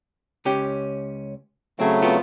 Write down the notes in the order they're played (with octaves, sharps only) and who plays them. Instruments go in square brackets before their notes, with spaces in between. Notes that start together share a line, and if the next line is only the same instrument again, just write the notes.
[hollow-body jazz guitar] C#2 C#4 G4
[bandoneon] C#3 F#3 A3 [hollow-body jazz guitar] C4 G#4
[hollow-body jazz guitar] B3 C4 F4